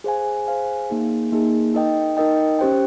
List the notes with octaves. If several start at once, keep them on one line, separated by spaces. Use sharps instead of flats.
G#4 C5 F5 G#5
G#4 C5 F5 G#5
A#3 D#4 G#4
A#3 D#4 G#4
D#4 A#4 D#5 G5
D#4 A#4 D#5 G5
C#4 G4 C5 G5